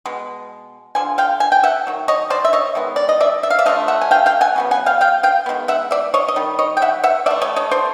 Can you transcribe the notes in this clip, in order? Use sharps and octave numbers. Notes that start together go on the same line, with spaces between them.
B2 G#3
D3 F3 G#5
F5 G5
G#5
G5
E5 F#5
D#3 F#3
C#5 D#5
C5 D5
E5
C#5 D#5
D#3 G#3 B3
D5
D#5
D5 E5
E5
F5
D5 E5
D3 F3 A3 D#5 F5
E5 F#5
G#5
F5 G5
F5 G5
F#5 G#5
C#3 F#3 B3
F#5 G#5
F5 G5
F5 G5
F5 G5
D#3 G#3 B3
E5 F#5
D5 E5
C#5 D#5
D#5
D#3 G3
C#5 D#5
G5
E5 F#5
E5 F#5
E3 A3 D5 E5
C#5 D#5
C#5 D#5
C5 D5